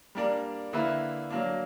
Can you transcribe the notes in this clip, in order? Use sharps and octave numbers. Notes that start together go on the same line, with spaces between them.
G3 A#3 D4 A#4 D5
D3 A#3 E4 B4 E5
F#3 A#3 D4